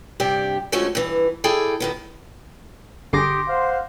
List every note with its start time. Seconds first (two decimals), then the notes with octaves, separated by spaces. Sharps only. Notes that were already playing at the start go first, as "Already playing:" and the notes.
0.20 G2 C3 G4 D5
0.72 D3 F3 G#3 A3 C#4 F#4
0.95 G2 E3
1.44 E4 G#4 A4 D5 G5
1.80 G2 D#3 B3
3.13 G1 D3 G4 G#4 C6 D6 D#6 A#6
3.48 C5 F5 F#5